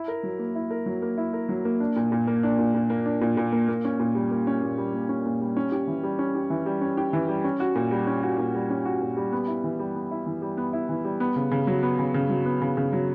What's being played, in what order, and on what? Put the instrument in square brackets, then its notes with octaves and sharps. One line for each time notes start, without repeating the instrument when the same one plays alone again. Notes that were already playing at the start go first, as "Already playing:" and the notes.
Already playing: [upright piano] E4
A#4
F#3
A#3
E4
A#4
F#3
A#3
E4
A#4
F#3
A#3
D4
A#2
A#2
A#3
D4
A#2
A#2
A#3
D4
A#2
A#2
A#3
A#3
C#4
A#2
G3
A#3
C#4
A#2
G3
A#3
C#4
A#2
G3
C#4
G4
E3
G3
C#4
G4
E3
G3
C#4
G4
E3
G3
C#4
F#4
A#2
G3
C#4
F#4
A#2
G3
C#4
F#4
A#2
G3
B3
E4
E3
G3
B3
E4
E3
G3
B3
E4
E3
G3
B3
C#3
C#3
F#3
B3
C#3
C#3
F#3
B3
C#3
C#3
F#3